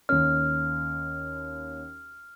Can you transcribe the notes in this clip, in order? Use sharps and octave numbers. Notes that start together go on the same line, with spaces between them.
D#2 C#4 F6